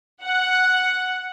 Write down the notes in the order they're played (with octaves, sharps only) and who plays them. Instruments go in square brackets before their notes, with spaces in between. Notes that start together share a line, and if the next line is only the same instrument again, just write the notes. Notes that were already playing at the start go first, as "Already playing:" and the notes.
[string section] F#5